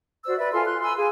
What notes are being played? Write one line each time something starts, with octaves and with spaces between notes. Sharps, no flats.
F#4 C5 D5 E6
B4 D5 E5
F4 A4 G#5 C6
C6 F#6
G#5 B5 C6 E6
G#4 F5 G#5